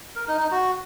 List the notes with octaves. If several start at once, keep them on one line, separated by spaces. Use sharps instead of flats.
A#4
D#4
D#4
F#4